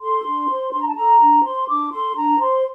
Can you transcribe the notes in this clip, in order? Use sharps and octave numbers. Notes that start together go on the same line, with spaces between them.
A4 C6
D4
C5
D4 C6
A#5
A5
A4 A#5
D4
C5 C6
D4 D6
A4 C6
D4 A#5
C5 C6